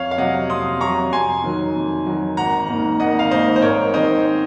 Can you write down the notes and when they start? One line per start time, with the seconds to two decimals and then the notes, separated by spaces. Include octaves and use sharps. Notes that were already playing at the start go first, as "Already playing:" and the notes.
Already playing: F2 C#5 F5
0.11 F5
0.18 C3 F#3 D#5 F#5
0.50 F2 C6 D#6
0.81 C3 F#3 A#5 C#6
1.13 F2 G#5 C6
1.44 D#3 F#3
1.75 F2
2.06 D#3 F#3
2.37 G#1 F#5 A#5
2.69 G#2 D#3 A#3
3.00 G#1 D#5 F#5
3.19 F5
3.31 G#2 D#3 A#3 C5 D#5
3.56 C5
3.62 G#2 A#4 C#5
3.94 D#3 G#3 C4 D#4 C5 D#5